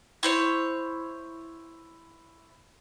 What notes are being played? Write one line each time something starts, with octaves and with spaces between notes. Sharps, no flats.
E4 C5 C#5